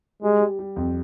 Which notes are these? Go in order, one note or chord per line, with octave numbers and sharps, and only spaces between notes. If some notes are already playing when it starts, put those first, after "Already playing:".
G3 G#3
G3
G3
F2